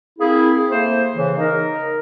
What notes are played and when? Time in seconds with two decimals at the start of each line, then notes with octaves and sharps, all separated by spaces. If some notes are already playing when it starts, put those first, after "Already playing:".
0.19 A#3 C4 E4 G#4
0.70 A3 A#3 C5
1.15 C#3 E3
1.37 D#4 A#4